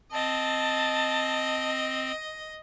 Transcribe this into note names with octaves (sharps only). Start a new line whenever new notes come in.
C4 D#5 A5